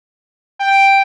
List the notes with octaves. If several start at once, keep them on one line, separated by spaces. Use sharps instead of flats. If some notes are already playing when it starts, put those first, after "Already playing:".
G5